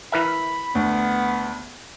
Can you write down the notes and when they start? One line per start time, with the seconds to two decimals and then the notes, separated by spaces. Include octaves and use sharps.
0.12 E3 A#4 E5 B5
0.75 D2 B3